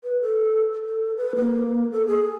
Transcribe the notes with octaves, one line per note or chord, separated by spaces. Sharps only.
B4
A4
A4
B4
A#3
A4
G#4